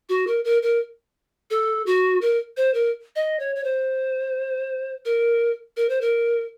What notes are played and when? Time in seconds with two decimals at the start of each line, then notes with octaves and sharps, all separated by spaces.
0.09 F#4
0.27 A#4
0.45 A#4
0.62 A#4
1.51 A4
1.86 F#4
2.22 A#4
2.57 C5
2.74 A#4
3.16 D#5
3.39 C#5
3.56 C#5
3.64 C5
5.05 A#4
5.77 A#4
5.89 C5
6.01 A#4